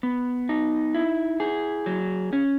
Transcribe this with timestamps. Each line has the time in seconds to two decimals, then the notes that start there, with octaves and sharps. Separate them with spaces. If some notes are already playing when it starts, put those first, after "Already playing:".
0.03 B3
0.49 D#4
0.95 E4
1.40 G#4
1.86 F#3
2.33 C#4